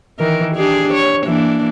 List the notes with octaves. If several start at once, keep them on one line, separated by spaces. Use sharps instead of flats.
D#3 E3 A#4
D4 G4 G#4
C#5
E3 A#3 D4